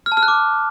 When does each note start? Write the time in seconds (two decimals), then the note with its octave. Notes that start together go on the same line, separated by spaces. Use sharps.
0.06 F6
0.12 A5
0.17 F6
0.23 F#6
0.28 D6